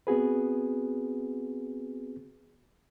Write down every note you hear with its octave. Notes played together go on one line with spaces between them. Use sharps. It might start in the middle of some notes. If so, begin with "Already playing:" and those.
B3 C4 F#4 G#4 B4